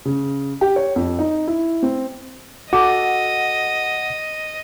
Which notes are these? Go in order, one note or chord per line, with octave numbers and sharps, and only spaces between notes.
C#3
G4
C#5
F2
D#4
E4
C4
F#4 A4 D#5 F#5 D6